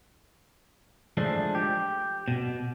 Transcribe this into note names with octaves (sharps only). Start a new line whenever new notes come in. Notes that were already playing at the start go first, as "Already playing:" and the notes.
F3 G#3 A3 D4
G4
B2